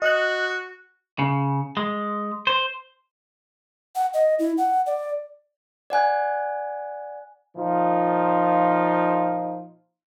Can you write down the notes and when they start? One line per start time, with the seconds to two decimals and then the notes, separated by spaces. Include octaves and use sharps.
0.02 F#4 D#5 F#6
1.19 C#3
1.77 G#3
2.47 C5
3.95 F#5
4.14 D#5
4.39 E4
4.58 F#5
4.86 D5
5.90 D5 F#5 G#5 F#6
7.56 A#2 F3 D#4 F4